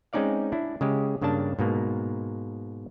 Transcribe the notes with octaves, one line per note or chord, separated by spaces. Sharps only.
G#3 C4 C#4 D#4 D5 F5
D4 E4
C#3 G#3 G4
G2 C#3 A#3 D4 A5
G#2 B2 A#3